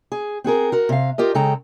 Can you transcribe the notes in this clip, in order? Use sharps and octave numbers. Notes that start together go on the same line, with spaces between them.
G#4
C4 F#4 G#4 A#4
F#4 A#4
C3 F5
F4 G4 A#4 D#5
C#3 G#3 A4 G5 A#5